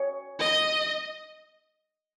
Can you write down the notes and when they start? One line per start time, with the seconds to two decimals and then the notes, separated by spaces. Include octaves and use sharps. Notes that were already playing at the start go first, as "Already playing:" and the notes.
Already playing: C#5
0.40 D#5